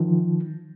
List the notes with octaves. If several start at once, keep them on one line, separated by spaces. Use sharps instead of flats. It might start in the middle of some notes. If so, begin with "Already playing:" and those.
Already playing: D#3 F3